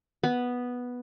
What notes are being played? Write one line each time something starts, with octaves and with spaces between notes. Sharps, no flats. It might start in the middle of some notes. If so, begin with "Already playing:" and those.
B3